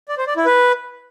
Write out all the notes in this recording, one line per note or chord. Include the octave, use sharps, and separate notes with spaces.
D5
C5
D5
E4
B4